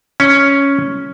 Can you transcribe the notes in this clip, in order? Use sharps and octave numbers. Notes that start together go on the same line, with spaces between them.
C#4